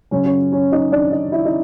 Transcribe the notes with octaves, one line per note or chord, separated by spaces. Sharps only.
F#2 C#3 F#3 C#4 C#5
C#4 C#5
C#4 C#5
D#4 D#5
D4 D5
D#4 D#5
E4 E5
D#4 D#5